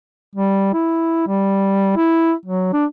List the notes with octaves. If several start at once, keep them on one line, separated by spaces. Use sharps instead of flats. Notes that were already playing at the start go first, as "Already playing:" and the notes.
G3
E4
G3
E4
F#3
D4